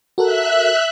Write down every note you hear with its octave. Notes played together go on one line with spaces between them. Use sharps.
F#4 A4 A#4 E5 F#6